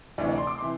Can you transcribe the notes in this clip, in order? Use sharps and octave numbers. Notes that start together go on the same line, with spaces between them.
D2 C3 E3 D5
D5
C6
D6
C3 E3 C6